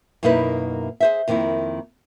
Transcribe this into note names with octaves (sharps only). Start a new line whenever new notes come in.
F#2 B2 A#3 D#4 E4 B4
G#4 C5 E5
F2 D#3 A#3 C4 E4